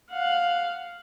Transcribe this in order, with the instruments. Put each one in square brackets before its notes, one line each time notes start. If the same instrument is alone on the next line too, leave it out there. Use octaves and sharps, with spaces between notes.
[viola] F5 F#5